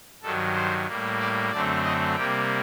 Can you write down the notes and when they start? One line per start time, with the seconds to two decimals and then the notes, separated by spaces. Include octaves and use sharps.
0.23 G2 D#3 F#3 A4
0.55 C5
0.87 A2 G3 A#3
1.19 D5
1.51 F#2 D3 A3 C4 D5
1.84 D#5
2.15 C3 G3 A#3 G5